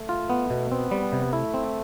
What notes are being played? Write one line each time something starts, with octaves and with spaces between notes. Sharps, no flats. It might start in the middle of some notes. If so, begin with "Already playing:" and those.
Already playing: A3
F4
B3
B2
B3 C4
G3
C3
A3 E4
C4